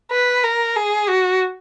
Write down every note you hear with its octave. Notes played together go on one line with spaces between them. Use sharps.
B4
A#4
G#4
F#4